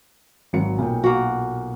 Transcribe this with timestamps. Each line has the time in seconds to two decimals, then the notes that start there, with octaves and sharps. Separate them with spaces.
0.53 G#1 F#3 C#7
0.78 B1 A#2 G5
1.04 A#3 F#4